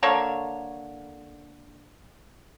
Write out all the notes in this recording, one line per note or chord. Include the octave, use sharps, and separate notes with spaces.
D3 A#3 A4 C#5